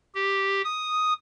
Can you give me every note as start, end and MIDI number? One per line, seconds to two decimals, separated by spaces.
0.14 0.62 67
0.64 1.13 87